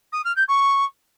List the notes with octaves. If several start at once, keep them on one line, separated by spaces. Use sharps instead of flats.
D#6
F6
G6
C#6